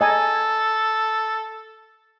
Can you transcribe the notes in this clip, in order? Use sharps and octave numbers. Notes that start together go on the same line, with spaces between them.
A4 D#5 G#5 A#5